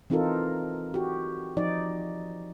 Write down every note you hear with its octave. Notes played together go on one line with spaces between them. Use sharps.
E3 C4 D#4 F4 A4 A#4
F#4 G4
F3 D#4 D5